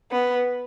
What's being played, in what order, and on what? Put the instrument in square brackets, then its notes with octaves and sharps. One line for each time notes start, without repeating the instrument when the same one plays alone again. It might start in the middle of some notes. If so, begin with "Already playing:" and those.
[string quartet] B3